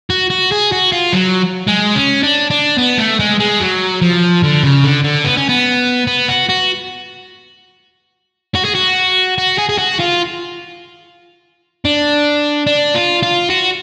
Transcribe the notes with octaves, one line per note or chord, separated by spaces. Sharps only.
F#4
F#4
G#4
F#4
F4
F#3
G#3
C#4
D4
D4
B3
A3
G#3
G#3
F#3
F3
D3
C#3
D3
D3
B3
C#4
B3
B3
F#4
F#4
F#4
G#4
F#4
F#4
G#4
G#4
F#4
F4
D4
D4
F4
F4
F#4